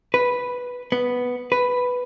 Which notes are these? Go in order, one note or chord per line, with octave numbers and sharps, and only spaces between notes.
B4
B3
B4